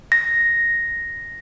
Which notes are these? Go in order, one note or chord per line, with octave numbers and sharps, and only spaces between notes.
A#6